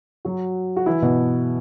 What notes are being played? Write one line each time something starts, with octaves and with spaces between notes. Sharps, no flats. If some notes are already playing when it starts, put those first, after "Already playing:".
F#3 F#4
F#4
E3 E4
B2 B3